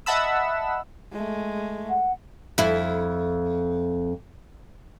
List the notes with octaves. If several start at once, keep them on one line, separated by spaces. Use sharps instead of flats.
D#5 E5 F#5 A5 B5 E6
G#3 A3
F#5
F2 E4